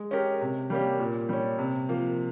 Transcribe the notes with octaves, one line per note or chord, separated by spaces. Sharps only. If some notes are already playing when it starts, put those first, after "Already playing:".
Already playing: G#3
C#4 G4 A#4
C3
G3 A#3 C#4 G4
A#2
G3 C#4
C3
F3 A#3